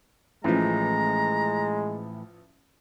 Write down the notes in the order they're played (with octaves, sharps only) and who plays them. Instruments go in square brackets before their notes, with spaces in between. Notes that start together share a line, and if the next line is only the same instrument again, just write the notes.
[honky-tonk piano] A1 F3 [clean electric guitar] A2 E3 [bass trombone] G#3 [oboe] A#5